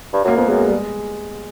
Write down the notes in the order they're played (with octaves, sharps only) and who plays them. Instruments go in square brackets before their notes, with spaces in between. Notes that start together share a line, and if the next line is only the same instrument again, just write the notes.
[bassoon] G2
[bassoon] F#2 [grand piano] A#3
[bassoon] F2 [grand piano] B3
[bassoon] F#2 [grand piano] G#3 A#3
[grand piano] G3
G#3